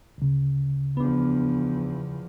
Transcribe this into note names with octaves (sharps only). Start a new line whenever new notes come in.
D2 C#3
E2 F3 B3 D4